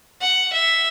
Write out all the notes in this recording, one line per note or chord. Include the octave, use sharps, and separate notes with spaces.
F#5
E5